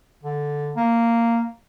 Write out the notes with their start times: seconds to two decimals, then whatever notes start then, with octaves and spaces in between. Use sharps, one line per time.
0.23 D3
0.77 A#3